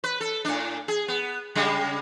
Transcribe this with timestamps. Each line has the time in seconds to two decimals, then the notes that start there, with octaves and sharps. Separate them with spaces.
0.04 B4
0.21 A4
0.45 A2 D4
0.88 G#4
1.08 B3
1.55 C#3 G3 G#3